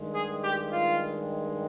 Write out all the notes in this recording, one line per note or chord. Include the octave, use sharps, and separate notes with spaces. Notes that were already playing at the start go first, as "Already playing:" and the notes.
Already playing: G2 D#3 G#3
G#4
G4
F4